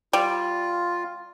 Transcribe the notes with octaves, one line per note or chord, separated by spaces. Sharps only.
G3 F4